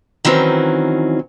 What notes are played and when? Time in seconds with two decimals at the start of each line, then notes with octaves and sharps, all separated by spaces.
0.25 D#3 E3 F#3 C4 C#4